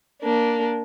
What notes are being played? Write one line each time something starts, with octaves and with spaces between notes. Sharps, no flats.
A#3 D4